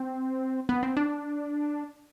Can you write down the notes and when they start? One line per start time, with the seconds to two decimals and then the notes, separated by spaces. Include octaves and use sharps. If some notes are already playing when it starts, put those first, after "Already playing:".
Already playing: C4
0.69 B3
0.83 C4
0.97 D4